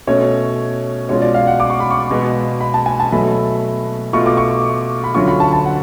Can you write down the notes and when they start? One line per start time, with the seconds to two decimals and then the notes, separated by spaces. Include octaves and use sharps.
0.07 B2 A3 C#4 C#5
1.09 B2 G#3 C#4 F4 C#5
1.22 D5
1.34 F5
1.47 F#5
1.60 D6
1.70 C#6
1.80 B5
1.90 C#6
2.11 B2 G#3 B3
2.61 B5
2.74 A5
2.86 G#5
3.00 A5
3.12 B2 F#3 A3 B5
4.13 B2 A3 F4 C#6
4.26 D6
4.37 C#6
5.04 B5
5.14 D2 D3 F#3 C#4 F4 C#6
5.27 B5
5.40 A5
5.53 A5
5.65 F#5